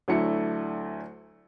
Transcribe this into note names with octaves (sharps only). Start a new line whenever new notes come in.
D2 F#3 A3 D4 E4 C#7